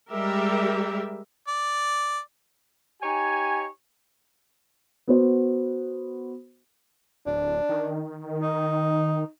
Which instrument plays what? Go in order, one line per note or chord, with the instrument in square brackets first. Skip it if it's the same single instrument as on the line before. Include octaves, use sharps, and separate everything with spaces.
[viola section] G3 G#3 G4 A#4 E5
[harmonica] D5
[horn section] D#4 G4 C#5 G#5
[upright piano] B3 F#4 C5
[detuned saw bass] D1 [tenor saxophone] D4
[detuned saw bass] D#3
[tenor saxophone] D#4